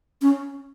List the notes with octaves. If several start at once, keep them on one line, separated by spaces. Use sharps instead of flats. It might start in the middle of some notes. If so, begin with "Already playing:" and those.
C#4